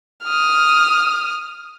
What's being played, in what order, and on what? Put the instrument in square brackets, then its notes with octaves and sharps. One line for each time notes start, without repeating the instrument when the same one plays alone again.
[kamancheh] D#6 F6